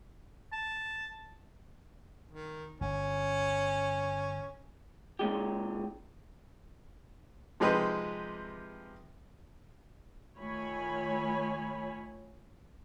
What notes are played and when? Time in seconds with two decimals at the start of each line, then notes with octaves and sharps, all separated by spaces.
0.52 A5
2.31 D#3
2.81 G1 C#4
5.19 A#2 C#3 G#3 G4
7.60 C3 F3 G#3 D#4 G4 B4
10.38 D#3 A3 F4 C#5 G#5 B5